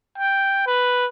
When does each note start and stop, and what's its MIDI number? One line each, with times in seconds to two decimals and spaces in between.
0.18 0.65 79
0.67 1.06 71